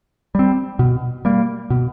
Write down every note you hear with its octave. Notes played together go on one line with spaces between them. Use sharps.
G3 C4
B2
G3 A#3
B2